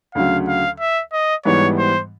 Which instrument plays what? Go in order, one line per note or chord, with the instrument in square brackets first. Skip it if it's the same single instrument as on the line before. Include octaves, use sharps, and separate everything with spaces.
[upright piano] D2 C#3 F#3 [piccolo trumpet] F5
[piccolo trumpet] F5
E5
D#5
[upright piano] G#2 E3 G3 B3 [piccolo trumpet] C#5
[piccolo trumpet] C5